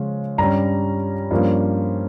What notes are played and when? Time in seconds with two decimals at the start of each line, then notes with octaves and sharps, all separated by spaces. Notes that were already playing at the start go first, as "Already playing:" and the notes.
Already playing: C#3 F3 G#3 C#4 F4
0.38 G2 G3 C#4 A#5
1.31 G2 F3 A#3 C#4 F4